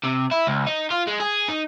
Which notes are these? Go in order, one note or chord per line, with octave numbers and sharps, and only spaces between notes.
C3
E4
C#2
D#4
F4
G#3
G#4
D#4